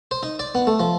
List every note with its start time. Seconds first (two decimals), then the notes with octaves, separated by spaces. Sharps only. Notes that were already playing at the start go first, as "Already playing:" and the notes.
0.11 C5
0.23 D#4
0.39 D5
0.55 B3
0.67 A3
0.80 F3